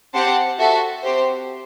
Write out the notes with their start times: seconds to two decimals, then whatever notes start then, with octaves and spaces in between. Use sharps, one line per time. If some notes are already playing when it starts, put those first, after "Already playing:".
0.15 C4 G4 C5 F#5 A5
0.59 F#4 A4 E5 A5
1.03 C4 G4 C5